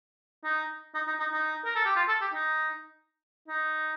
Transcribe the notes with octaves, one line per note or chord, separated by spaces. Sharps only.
D#4
D#4
D#4
D#4
D#4
A#4
A4
G4
F4
A4
G4
D#4
D#4